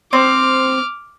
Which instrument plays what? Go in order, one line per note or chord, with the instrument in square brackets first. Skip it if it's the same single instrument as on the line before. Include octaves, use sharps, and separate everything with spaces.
[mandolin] C4 [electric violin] D6 F6